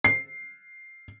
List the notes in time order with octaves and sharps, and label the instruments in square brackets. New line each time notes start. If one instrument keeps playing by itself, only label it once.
[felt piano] C7